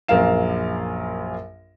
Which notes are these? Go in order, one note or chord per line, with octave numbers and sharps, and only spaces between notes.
A#1 F#2 A#4 F5 E7